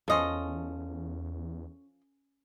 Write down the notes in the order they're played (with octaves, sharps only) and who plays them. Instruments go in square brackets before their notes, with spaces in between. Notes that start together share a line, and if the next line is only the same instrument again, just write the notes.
[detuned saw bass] E2 [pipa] F3 D#5 C6 [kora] C#4 A4